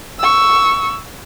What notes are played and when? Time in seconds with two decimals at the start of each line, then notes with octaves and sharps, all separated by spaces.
0.19 C#6 E6